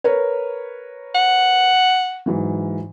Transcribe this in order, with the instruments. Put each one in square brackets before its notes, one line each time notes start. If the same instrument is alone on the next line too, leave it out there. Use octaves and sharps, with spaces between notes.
[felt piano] A#4 B4 C#5
[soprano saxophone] F#5
[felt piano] G#2 E3 F#3